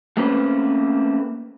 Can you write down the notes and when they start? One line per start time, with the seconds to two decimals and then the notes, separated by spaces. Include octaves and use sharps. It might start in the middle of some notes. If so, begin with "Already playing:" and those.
0.17 A3 A#3 C4 C#4 B4